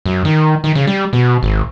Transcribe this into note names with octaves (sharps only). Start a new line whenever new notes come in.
F#2
D#3
D#3
C#3
G3
B2
G#1